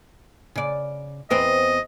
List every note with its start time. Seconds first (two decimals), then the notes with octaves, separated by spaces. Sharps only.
0.56 C#3 D5
1.30 E2 B3 C4 D#5